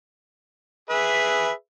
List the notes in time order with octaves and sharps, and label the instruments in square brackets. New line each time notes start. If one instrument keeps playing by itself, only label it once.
[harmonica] G#4 B4 E5